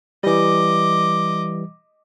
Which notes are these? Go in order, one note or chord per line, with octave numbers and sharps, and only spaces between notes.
E3 G3 D#5 D6